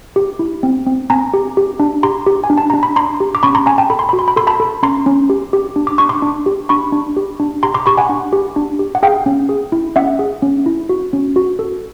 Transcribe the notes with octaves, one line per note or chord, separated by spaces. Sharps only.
G4
E4
C4
C4
C4 G#5 A#5
G4
G4
D4
G4 A#5 C6
G4
G#5
D4
A5
D4 A#5
B5
D4 A#5 C6
G4
D6
C#4 B5 C#6
A#5 C6
C#4 G#5 A#5
G5 A5
A4 B5
C6
F#4 B5
C6
B5
A4 C6
A5 B5
A4
C#4 A#5 C6
C#4
G4
G4
D4
D6
D4 C#6
C6 D6
D4
G4
D4 B5 C#6
D4
G4
D4
G4 A#5 C6
C6 D6
G4 B5 C#6
F#5 G#5
D4
G4
D4
G4
F#5
G#4 F5 G5
C#4
G#4
E4
C#4 E5 F#5
G#4
C#4
E4
F#4
C#4
F#4
A4